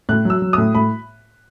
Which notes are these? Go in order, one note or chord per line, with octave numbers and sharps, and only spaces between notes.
A2 F#6
F#3 E6
F#3
A2 D#6
A2 B5